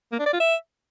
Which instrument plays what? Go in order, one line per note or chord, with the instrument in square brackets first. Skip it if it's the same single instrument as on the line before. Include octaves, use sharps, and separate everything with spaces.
[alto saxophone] A#3
D4
D5
F4
E5